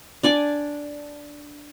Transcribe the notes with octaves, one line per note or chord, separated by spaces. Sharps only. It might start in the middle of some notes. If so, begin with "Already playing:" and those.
D4 D5 G#5 D6